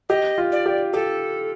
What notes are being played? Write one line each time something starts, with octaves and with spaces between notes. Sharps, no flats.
G4 D#5
F4
D5
G4
G4 A4